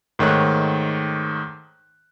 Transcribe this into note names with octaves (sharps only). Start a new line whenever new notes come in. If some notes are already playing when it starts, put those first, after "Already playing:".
G#2 D#3 A3 C#5 F#6